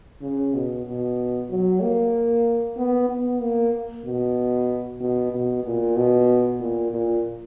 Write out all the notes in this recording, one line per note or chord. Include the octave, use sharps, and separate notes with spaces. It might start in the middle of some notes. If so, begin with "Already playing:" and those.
C#3
B2
B2
F#3
A#3
B3
B3
A#3
B2
B2
B2
A#2
B2
A#2
A#2